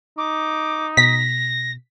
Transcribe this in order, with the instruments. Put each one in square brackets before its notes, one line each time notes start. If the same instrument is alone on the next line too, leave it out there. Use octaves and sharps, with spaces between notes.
[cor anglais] D#4 [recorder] D6
[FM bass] B2 [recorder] A#6 [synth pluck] B6